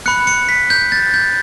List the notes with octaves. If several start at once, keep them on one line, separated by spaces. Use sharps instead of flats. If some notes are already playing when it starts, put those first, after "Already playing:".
B5 F#6 C#7
C#7
B6
G6
A6
G6